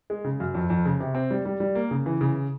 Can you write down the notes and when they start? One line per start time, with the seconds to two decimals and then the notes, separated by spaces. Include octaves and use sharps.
0.10 G#3
0.24 C#3
0.40 F#2
0.54 F2
0.70 F2
0.85 C#3
1.00 C3
1.15 C4
1.30 G3
1.45 G3
1.60 G3
1.75 A#3
1.91 C#3
2.06 E3
2.21 C#3